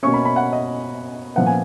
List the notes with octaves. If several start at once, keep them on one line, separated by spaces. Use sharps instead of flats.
B2 A#3 C#4 C#6
B5
B5
F#5
D#5
A#2 F3 B3 F#5
G#5